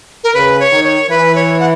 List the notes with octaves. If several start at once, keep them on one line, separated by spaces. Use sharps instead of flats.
A#4
C#3 B4
C#5
D#3
C#5
E3 B4
C#5
F#5